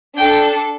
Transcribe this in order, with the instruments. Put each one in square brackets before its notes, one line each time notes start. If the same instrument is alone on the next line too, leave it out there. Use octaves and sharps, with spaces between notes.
[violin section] D4 A4 G5